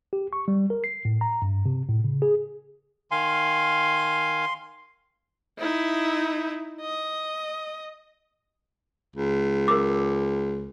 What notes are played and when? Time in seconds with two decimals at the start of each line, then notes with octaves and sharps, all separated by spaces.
0.13 G4
0.33 C#6
0.48 G3
0.70 A#4
0.84 C7
1.05 A2
1.21 A#5
1.42 G2
1.66 C3
1.89 A2
2.04 C#3
2.22 G#4
3.11 D#3 F5 G#5 C6
5.59 D#4 E4
6.81 D#5
9.16 C#2
9.68 A#4 D6